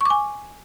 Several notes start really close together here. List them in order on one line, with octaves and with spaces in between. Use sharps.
C#6 D6 G#5